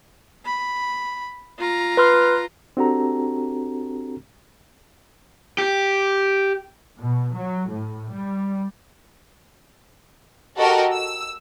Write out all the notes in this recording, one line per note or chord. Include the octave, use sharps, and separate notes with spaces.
B5
F4 A#5
B4 C6 F6
C4 D4 F#4 G4 A4 A#5
G4
B2
F#3
A2
G3
F#4 G4 A4 A#4 D#5
E6